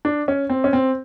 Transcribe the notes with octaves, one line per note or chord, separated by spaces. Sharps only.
D4
C#4
C4
C#4
C4